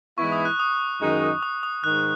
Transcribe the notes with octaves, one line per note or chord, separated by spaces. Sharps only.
G#2 E3 G#3 B3 E4 C#6
D#6
F#6
D#6
F#2 D#3 G#3 D#4
D#6
D#6
G#2 D#3 F#6